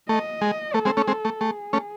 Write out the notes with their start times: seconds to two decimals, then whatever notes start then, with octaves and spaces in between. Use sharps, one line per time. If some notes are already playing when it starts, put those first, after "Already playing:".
0.09 A3 D#5
0.41 G#3
0.74 A3 A4
0.85 G#3 C4
0.97 A3 C#4
1.07 G#3 C4
1.25 A3
1.41 A3 G#4
1.73 A3 C#4